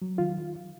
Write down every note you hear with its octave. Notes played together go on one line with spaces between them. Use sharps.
F#3
D#3 F4